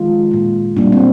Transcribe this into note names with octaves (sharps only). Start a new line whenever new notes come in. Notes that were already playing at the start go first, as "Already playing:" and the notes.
Already playing: D#3 G#3 F4
A#2 G#3
A#2 G3 A#3 D4
C4